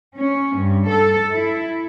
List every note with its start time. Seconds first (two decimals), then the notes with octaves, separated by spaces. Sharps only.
0.17 C#4
0.58 G2
0.90 A4
1.33 E4